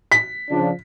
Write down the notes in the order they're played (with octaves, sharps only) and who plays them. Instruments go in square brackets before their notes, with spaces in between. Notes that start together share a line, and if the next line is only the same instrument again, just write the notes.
[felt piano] B6
[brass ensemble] C#3 F3 D4